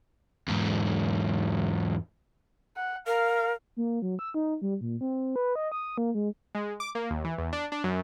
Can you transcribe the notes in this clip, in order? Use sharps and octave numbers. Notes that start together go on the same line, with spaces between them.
E2 G#2
F#5
A#4 F5
A#3
F#3
E6
D#4
G3
A#2
C4
B4
D#5
D#6
A#3
G#3
G#3
D6
A#3
D#2
E3
E2
D4
D4
F#2